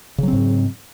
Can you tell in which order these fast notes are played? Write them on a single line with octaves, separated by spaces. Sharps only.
C#3 F#3 C4 G#2